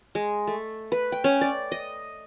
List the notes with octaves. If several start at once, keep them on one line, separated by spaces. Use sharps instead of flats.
G#3
A3
B4
G5
C#4
D5
D#5